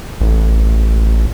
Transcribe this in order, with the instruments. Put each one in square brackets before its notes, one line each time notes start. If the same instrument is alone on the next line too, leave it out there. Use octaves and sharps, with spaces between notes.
[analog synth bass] A1